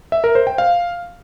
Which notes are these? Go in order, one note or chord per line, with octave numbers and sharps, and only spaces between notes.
E5
A#4
C5
G5
F5